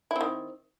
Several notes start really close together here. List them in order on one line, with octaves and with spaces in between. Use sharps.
E4 C4 D#3